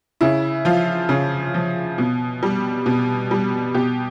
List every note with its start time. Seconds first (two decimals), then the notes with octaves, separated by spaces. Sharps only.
0.21 C#3 E4
0.65 F3 F4
1.09 C#3
1.54 F3
1.98 B2
2.43 G3
2.86 B2
3.31 G3
3.74 B2 G4